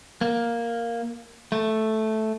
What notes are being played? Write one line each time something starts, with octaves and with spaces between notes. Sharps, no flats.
A#3
A3